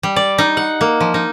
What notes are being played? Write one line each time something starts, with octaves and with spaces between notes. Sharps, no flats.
G3
D5
D#4
F#5
A#3
F3
D#4